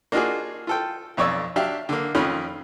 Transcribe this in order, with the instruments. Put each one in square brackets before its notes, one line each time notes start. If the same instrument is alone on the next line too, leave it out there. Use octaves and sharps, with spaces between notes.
[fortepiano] A#3 D4 D#4 F4 F#4 G#4
F4 A4 G5
B1 F2 C#5 D5 E6
F#3 D4 G4 E5 F5
D3 A#3
F2 D#3 F3 C#4 B5